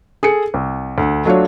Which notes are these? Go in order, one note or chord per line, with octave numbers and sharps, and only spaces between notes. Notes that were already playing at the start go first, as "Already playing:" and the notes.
G#4 A4 C#7
C2
D2
F#3 A3 D4 F4 F#4 C#5